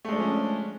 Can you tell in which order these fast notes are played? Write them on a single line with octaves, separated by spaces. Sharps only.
A3 G#3 D4 F3 C#4